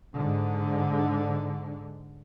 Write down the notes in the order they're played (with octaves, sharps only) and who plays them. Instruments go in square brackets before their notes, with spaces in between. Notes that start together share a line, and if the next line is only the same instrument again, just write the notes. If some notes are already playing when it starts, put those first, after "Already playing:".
[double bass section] G#2 D3